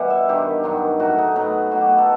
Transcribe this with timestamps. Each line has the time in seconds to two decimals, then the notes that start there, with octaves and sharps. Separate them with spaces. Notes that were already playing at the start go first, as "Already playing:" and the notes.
Already playing: B2 E3 G3 F#5
0.10 E5
0.29 G2 D#3 G3 G4
0.64 G2 D#3 F#3
0.99 A2 F#3 F#4
1.19 D#4
1.36 A2 F#3 B3
1.71 B2 F#3 F#4
1.81 G4
1.89 B4
1.98 A4